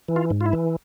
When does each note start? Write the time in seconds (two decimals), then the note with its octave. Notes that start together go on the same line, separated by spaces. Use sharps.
0.08 E3
0.16 F4
0.30 G#2
0.41 F4
0.46 E4
0.53 E3